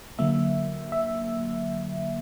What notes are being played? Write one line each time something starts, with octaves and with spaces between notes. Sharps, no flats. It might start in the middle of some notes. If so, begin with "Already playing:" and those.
D3 F#3 A#3 E5
E5